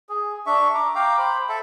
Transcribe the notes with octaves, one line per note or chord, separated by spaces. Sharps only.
G#4
D4 E5 C#6
A#5 D6
F5 G5 A#5 D6
C5 B5
A4 E5 A5